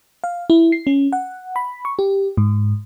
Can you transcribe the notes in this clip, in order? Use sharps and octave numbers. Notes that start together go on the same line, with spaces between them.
F5
E4
C7
C#4
F#5
B5
C#6
G4
G#2